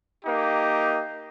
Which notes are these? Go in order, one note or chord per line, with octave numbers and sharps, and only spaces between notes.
A#3 D#4 G4